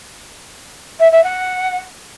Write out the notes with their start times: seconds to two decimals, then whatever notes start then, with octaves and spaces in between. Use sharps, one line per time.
1.00 E5
1.12 E5
1.23 F#5